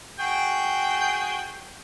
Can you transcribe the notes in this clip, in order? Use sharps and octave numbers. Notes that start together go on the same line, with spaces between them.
F#4 G#4 G5